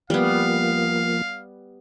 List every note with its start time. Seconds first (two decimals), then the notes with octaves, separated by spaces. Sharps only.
0.10 F3 G3 A#3 B3 F5